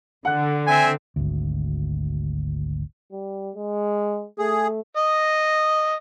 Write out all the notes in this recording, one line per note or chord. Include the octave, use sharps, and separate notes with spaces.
D3 F#5 F#6
C4 E5 G#5
G#1 D2
G3
G#3
A3 G#4
D#5